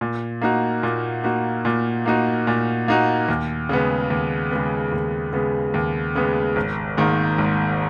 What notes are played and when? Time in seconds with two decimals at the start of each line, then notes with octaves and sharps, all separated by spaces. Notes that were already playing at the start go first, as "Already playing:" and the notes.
0.01 A#2
0.42 A#3 D#4 F#4
0.83 A#2
1.24 A#3 D#4 F#4
1.65 A#2
2.06 A#3 D#4 F#4
2.47 A#2
2.88 A#3 D#4 F#4
3.28 D#2
3.69 C#3 G#3 B3
4.10 D#2
4.51 C#3 G#3 B3
4.92 D#2
5.33 C#3 G#3 B3
5.74 D#2
6.15 C#3 G#3 B3
6.56 G#1
6.97 G#2 D#3 A#3
7.38 G#1